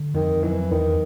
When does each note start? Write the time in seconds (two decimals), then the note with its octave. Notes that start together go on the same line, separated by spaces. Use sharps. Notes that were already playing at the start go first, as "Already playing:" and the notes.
Already playing: D3
0.14 F2 D#3
0.43 E3 F#3
0.71 E2 D#3